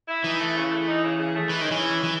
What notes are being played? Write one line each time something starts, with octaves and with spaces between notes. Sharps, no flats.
E4
E3 D#4
A3
C#3
A3
D#4
C#3
C#3
A3
E3 G#3
D#3 C#4
E3
C#4
G#3
E3